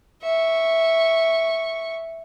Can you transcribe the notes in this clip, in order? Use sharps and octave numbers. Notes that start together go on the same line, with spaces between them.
E5 C#6